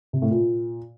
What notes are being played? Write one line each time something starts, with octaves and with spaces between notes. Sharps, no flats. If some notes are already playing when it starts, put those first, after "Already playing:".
C3
A2
A#2